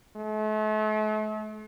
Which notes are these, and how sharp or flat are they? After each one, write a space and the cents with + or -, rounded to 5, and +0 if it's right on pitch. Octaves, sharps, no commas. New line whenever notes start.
A3 -40